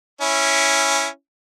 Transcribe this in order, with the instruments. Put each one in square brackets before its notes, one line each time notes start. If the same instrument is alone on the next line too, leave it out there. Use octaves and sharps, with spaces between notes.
[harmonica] C#4 E4